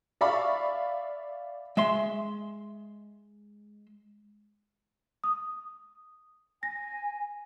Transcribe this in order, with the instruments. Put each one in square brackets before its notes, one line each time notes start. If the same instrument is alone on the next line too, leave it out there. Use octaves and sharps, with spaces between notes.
[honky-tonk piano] D5 E5 F5 B5 C#6
[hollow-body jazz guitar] G#3 E5 C6
[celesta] D#6
[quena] G#5 [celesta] A#6